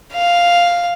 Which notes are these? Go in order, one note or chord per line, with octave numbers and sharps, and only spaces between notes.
F5